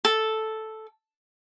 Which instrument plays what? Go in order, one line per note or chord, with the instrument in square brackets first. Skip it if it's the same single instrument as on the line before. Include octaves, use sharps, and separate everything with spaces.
[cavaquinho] A4